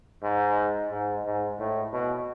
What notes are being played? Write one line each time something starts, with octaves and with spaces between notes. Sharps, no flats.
G#2
G#2
G#2
A2
B2